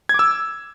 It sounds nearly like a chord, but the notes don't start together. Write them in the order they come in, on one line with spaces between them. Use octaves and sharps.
G#6 D6 E6